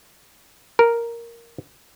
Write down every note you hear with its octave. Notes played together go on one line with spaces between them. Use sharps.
A#4